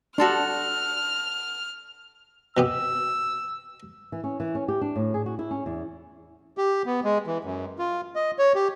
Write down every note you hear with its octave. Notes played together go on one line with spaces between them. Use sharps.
D4 F#4 A4 C6 F6
B2 B3 G4 E6
E3
C#4
E3
C#4
G4
D4
A2
G#4
F#4
E4
C#4
E2
G4
B3
G#3
E3
F#2
F4
D#5
C#5
G4